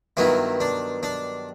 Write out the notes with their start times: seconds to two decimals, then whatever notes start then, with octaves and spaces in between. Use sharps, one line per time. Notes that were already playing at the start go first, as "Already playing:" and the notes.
0.17 G2 D#3 F#3 B3 E4
0.60 D4
1.03 D4